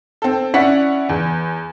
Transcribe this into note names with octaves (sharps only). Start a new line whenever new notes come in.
C4 A4
C#4 E4 D5 F#5 B6
E2